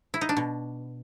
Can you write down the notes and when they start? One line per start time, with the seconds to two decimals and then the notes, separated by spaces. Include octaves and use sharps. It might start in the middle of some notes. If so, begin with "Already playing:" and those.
0.14 E4
0.21 D#4
0.29 D4
0.37 B2